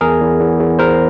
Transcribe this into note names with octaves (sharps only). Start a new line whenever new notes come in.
E2 G#4 A#4
E2
E2
E2
E2 A#4 C5